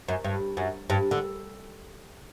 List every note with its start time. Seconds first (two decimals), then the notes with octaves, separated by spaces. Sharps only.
0.08 F#2
0.24 G2
0.57 F#2
0.90 G2
1.11 D3